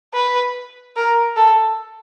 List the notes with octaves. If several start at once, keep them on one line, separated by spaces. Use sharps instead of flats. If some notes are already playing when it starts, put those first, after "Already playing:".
B4
A#4
A4